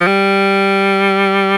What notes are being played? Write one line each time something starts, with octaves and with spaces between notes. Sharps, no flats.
F3
G3